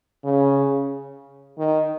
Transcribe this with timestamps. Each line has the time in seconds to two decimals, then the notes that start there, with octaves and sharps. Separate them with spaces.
0.24 C#3
1.58 D#3